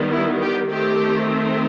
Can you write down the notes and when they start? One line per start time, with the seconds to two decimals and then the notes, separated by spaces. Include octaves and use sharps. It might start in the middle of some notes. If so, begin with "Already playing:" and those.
Already playing: D#3 G3 B3
0.12 E4
0.42 G4
0.70 D#3 A3 C4 G4